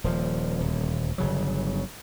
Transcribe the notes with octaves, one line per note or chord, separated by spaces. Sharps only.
D#1 F3
D#1 D2
G1 C#3 F#3